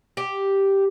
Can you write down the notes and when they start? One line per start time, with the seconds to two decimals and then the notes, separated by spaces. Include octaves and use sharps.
0.17 G4